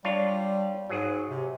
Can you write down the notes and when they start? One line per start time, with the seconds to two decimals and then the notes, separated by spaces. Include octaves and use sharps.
0.05 G3 D4 F4 C#5
0.89 G#2 F#3 G#4
1.29 C3